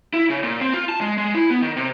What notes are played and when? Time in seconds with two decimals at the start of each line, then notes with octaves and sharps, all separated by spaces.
0.13 E4
0.30 C#3
0.43 A#2
0.61 C4
0.73 F4
0.89 A5
1.01 G#3
1.18 G#3
1.34 E4
1.50 B3
1.62 D#3
1.77 C3